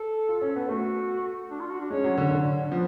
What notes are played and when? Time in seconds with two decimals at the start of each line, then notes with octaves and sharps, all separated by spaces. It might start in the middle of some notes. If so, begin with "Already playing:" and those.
Already playing: A4
0.29 F4
0.42 C#4
0.56 B3
0.69 A3 F#4
1.51 D4
1.60 F4
1.70 F#4
1.80 D4
1.90 G#3 C#4
2.04 F#3
2.17 D3
2.31 D3
2.71 F3 B3